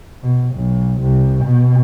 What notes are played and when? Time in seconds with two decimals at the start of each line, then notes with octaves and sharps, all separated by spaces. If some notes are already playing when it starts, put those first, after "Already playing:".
0.23 B2
0.55 B1
1.01 C2
1.44 B2